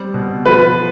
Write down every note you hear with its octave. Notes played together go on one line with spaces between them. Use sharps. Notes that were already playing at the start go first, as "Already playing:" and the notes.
Already playing: G3 C4
B2
F3 B4